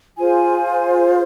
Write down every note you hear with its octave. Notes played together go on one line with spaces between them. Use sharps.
F4 G#4 C5 G#5